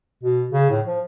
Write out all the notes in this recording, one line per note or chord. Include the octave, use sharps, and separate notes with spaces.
B2
C#3
A2
F3